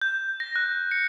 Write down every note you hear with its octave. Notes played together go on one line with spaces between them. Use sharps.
G6
A#6
F#6
C#7